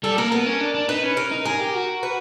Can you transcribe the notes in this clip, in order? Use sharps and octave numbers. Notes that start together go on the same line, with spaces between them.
G3 A4
A#3 A#4
B3 A#4
C#4
D4
D4
D#4 B4
C#4
A#4
D#4
G#4 A#4
G4
F#4
B4